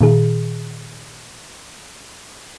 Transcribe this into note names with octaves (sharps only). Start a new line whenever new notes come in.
A#2 D#3 G#4